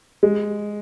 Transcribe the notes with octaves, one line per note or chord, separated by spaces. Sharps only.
G#3